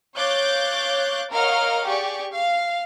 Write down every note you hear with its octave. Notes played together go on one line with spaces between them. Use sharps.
C#5 F5 D6 F#6 G6 A6
A#4 C#5 D#5 F5 F#5 F6
G4 G#4 D5 C#6
F5